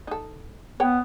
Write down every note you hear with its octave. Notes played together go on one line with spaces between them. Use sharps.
D#4 A4
B3 C#5 F#5 G5